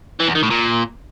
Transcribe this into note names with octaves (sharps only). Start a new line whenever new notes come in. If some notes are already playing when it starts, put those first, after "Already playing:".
E3
E2
D#3
A2
A#2